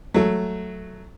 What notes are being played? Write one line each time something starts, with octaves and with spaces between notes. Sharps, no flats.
F#3 A3